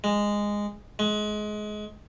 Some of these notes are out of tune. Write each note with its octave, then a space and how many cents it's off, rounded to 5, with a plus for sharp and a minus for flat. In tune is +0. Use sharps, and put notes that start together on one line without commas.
G#3 -10
G#3 +25